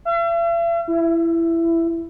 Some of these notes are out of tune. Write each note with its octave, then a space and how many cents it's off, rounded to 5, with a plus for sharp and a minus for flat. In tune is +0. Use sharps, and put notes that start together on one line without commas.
E5 +45
E4 +15